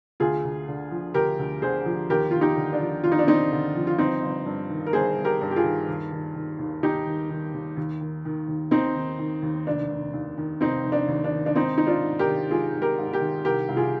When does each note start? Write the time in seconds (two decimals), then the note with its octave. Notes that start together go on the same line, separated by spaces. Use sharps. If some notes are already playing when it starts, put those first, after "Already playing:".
0.20 D2 F4 G#4
0.44 D2
0.68 D3
0.91 F3
1.14 D2 G4 A#4
1.39 D2
1.62 D3 G#4 C5
1.86 F3
2.10 D#2 G4 A#4
2.31 D#2 F4
2.41 D#4 G4
2.56 D3
2.73 D4
2.81 F3
3.04 D#2 F4
3.12 D#4
3.19 D4
3.27 D#2 C4 D#4
3.51 D3
3.76 F3
3.87 F4
3.98 G1 C4 D#4
4.22 G1
4.46 G2
4.70 D#3
4.86 A#4
4.93 G1 G#4 C5
5.17 G1
5.25 G4 A#4
5.41 G2
5.51 G4
5.56 F4 G#4
5.64 D#3
5.88 D#2
6.11 D#3
6.35 D#3
6.59 D#2
6.82 D#2 D#4 G4
7.06 D#3
7.30 D#3
7.54 D#2
7.77 D#2
8.01 D#3
8.25 D#3
8.48 D#2
8.71 D#2 C4 D#4
8.96 D#3
9.19 D#3
9.42 D#2
9.67 F1 D4
9.90 F1
10.13 D#2
10.38 D#3
10.61 F1 C4 D#4
10.85 F1
10.92 D4
11.08 D#2
11.24 D4
11.31 D#3
11.46 D4
11.55 G#1 C4 D#4
11.78 G#1 D#4
11.87 D4 F4
12.03 G#2
12.19 G4 A#4
12.27 D#3
12.51 G#1 F4 G#4
12.74 G#1
12.82 G4 A#4
12.98 G#2
13.13 G4 A#4
13.21 D#3
13.45 C2 G4 A#4
13.69 C2
13.77 F4 G#4